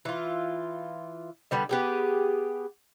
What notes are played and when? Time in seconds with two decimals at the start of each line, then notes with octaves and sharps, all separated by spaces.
0.05 E3 F4
1.51 D3 G3 B3
1.69 B3 G4 G#4